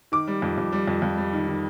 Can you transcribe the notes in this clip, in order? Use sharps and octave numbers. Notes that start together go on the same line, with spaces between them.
D#3 D6
G3
F2
F2
G3
F2
F2
G3
D#3
D#3